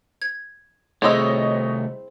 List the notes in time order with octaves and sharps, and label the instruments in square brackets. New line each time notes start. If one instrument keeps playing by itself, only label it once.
[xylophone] G#6
[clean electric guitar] C2 A3 [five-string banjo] C4 E4 [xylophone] G#4 E6 [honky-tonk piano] C#5 D#5